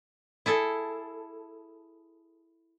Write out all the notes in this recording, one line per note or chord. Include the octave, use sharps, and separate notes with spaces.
E4 G#4 A4